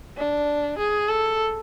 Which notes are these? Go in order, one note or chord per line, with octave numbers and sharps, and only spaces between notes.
D4
G#4
A4